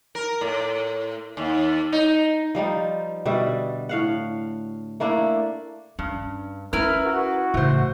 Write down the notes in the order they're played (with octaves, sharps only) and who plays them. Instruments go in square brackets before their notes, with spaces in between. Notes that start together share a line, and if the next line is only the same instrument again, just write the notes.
[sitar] A#4
A2
D#2
D#4
[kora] F3 G3 D#4
B2 D3 G3 E5
A2 F5 F#5
A3 A#3 D4 E4
[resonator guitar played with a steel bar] G2 [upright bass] C#4
[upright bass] C#4 [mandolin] E4 F6 [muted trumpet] A#4 [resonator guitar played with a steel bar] B4
[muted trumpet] F#4
[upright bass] A2 C#3 [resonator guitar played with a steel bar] E3 C5